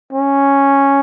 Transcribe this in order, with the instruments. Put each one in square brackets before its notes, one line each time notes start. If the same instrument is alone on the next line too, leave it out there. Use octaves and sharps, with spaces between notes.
[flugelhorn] C#4